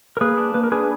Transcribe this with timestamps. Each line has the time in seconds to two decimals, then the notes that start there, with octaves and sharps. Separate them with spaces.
0.17 A#4
0.21 A#3 G#4 B4
0.38 D4
0.54 A#3 B4
0.64 A#4
0.72 D4 G#4 B4